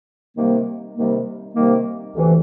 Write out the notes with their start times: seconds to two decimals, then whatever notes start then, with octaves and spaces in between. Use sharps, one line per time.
0.36 C3 D#3 G3 A#3
0.95 C3 D#3 G3 A#3
1.54 C3 D#3 G3 A#3
2.14 D2 C3 E3